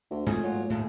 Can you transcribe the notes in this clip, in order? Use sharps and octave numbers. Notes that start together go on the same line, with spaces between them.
D2
F2 G#2 A3 G#4
A#2 F#3 F4
D#2 A2 A3 G#4